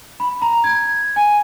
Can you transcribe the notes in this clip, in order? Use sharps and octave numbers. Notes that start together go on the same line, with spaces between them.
B5
A#5
G#6
G#5